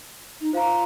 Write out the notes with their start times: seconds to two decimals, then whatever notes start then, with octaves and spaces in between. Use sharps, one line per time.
0.41 D#4
0.53 F4 C5 F5 A#5